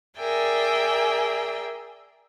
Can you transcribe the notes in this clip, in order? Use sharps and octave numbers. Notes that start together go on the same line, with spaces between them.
G#4 A#4 D5 E5 G5 G#5